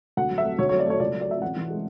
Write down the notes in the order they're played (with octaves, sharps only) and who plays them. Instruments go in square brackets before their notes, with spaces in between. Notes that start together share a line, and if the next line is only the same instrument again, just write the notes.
[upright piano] D2 F#5
F#3
E5
A3
D2 C#5
C#5
F#3
D5
A3 C#5
C#2 D5
F#3
D5
A3 E5
A1 F#5
E3
G#3